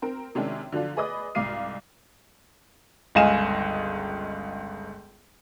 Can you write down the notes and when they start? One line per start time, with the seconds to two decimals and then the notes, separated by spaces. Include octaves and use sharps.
0.02 C4 A#4
0.35 C3 D#3 G#3 C#4 D4
0.72 D3 F3 F#3 D4 F4
0.97 G#4 B4 D5 D#5 B5 D#6
1.35 C2 G#2 F5 D6 C7 D#7
3.15 G1 C#2 D#5 F5 G#5 E7